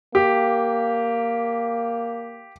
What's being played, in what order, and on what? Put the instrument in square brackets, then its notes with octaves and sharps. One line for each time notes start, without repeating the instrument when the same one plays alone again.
[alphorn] A#3 [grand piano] G4